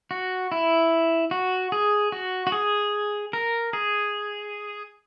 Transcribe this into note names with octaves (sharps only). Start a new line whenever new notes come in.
F#4
E4
F#4
G#4
F#4
F#4
G#4
A#4
G#4